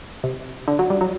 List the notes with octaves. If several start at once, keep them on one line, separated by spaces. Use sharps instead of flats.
C3
D3
F#3
G3
F#3